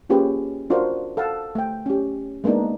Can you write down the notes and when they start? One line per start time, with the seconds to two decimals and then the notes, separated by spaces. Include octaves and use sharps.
0.09 A#3 C#4 F4 G4 G#4 B4
0.70 D4 F4 F#4 A#4 C5
1.17 A4 F5 F#5 A5
1.55 A3 G5
1.86 C#4 G4
2.44 G#3 A#3 B3 D4 D#4